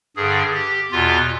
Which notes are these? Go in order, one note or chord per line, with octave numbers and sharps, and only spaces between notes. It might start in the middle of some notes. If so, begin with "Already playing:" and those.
G2 D3 G#4
G4
E2 B2 F4